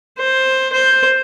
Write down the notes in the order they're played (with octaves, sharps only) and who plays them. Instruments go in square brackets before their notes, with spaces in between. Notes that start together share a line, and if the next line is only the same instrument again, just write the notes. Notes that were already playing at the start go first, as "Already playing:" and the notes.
[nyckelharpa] C5
C5